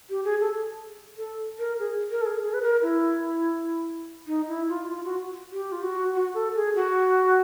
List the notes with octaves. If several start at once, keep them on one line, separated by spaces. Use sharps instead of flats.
G4
G#4
A4
A4
A#4
G#4
A#4
A4
G#4
G#4
B4
A#4
E4
D#4
E4
F4
F4
F#4
G4
F4
F#4
F#4
A4
G#4
F#4